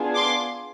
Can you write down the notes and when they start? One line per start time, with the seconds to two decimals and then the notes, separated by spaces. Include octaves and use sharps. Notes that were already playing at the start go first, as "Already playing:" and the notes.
Already playing: B3 D4 F4 G#4
0.15 C6 D6